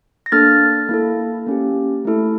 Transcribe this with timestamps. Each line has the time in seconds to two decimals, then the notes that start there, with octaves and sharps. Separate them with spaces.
0.26 A#6
0.32 A#3 D4 A4 F6 A6
0.89 A#3 E4 A4
1.47 A#3 C#4 G4
2.05 A3 E4 A4